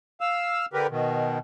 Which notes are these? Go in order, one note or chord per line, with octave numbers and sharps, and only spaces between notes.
F5 E6
D3 G4 A#4 B4
B2 D#3